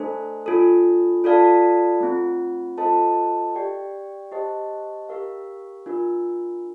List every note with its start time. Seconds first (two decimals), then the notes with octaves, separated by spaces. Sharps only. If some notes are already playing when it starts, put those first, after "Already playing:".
Already playing: A3 D4 A4 C5
0.46 D4 F4 A4
1.24 F4 A4 D5 F5 A5
2.00 A3 C4 F4
2.78 F4 A4 C5 D#5 A5
3.55 G4 D5 G5
4.32 G4 C5 D#5 A5
5.09 G4 A#4 F5
5.86 D4 F4 A#4